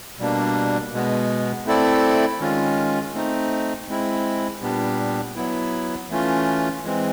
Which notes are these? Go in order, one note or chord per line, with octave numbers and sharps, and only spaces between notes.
B2 G3 A#3 D4
B2 G#3 B3
A3 C4 E4 A4 D5
D#3 G#3 C#4 F4
A3 C4 D#4
G#3 C4 E4
A#2 G3 B3 D4 G4
F#3 B3 E4
E3 A3 C#4 F4
E3 G#3 C4